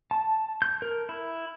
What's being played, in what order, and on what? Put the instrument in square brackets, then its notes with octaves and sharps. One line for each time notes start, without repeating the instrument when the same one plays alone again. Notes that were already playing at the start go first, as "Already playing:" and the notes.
[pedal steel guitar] A5
G6
A#4
E4